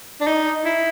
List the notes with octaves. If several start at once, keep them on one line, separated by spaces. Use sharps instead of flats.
D4
D#4
E4